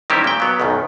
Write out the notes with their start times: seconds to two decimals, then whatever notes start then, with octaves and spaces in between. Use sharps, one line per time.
0.10 D#3 G3 C4 C#4 E4 G4
0.24 A#2 G5
0.40 F#3 B3
0.60 B1 F#2 B2 D#3